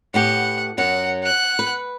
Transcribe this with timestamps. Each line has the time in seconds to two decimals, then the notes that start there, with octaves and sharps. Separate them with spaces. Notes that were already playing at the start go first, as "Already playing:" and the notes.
0.14 A2 B3 G4 F#5
0.78 F#2 F#3 F#5
1.23 F#5 F#6
1.59 B4